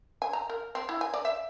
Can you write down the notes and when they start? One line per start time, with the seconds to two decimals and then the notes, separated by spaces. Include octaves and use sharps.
0.22 G#5
0.33 A#5
0.50 A#4
0.75 C4
0.89 E4
1.01 G#5
1.14 D5
1.25 E5